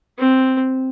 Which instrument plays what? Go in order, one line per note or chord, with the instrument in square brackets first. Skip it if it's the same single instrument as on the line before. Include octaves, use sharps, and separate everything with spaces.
[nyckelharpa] C4